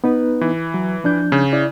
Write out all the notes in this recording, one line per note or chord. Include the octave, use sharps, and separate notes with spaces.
B3 D#4 B4
E3
F#3
F3 D4 G6
C#3
E4 D5